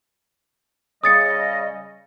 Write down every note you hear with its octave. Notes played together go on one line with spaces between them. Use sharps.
C#3 G3 D#5 D#6 A6 C#7